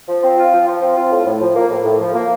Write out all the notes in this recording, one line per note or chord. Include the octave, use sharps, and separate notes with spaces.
F3
C4
F4
F3
F3
C4
F4
A2
A2
F3
A#3
A2
A2
F3
A#3